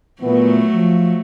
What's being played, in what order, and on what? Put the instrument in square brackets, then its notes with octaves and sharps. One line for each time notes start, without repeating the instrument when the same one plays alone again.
[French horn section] A#2 E3 B3 [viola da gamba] F#3 A3
[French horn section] F3